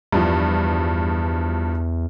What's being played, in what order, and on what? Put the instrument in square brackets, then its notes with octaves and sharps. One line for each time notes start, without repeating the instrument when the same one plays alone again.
[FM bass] E2 [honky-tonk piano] G2 F3